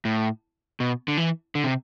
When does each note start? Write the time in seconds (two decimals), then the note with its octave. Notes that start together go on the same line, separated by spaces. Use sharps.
0.05 A2
0.80 B2
1.08 D3
1.17 E3
1.55 D3
1.64 C3